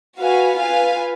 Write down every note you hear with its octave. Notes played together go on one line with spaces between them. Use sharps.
F#4 B4 F5 G#5
F4 B4 F5 G#5